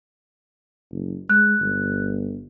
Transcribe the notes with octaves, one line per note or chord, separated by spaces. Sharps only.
F#1
G#3 F#6
G1